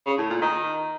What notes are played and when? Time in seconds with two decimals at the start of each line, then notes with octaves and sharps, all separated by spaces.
0.06 C#3
0.18 A2
0.30 A#2
0.42 D#3